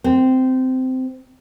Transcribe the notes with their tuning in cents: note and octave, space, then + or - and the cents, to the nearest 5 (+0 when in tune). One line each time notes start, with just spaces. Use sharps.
C4 -15